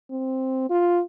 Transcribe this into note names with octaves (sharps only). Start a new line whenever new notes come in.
C4
F4